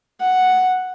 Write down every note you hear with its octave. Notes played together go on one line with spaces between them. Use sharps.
F#5